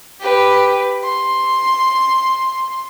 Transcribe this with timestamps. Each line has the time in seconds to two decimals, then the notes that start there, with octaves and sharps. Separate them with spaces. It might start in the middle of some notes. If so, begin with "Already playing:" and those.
0.21 G4 B4
1.04 C6